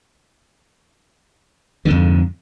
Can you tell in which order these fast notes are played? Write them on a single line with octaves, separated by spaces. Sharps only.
D3 G#2 F2